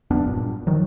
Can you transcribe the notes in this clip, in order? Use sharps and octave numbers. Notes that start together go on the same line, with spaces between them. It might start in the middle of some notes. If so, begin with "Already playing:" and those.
F1 F#2 B3 D4
G2 A#2
D#3 F3 F#3